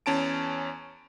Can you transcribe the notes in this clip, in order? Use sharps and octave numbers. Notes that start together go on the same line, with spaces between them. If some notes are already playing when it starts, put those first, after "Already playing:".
E2 C#4 A5 D7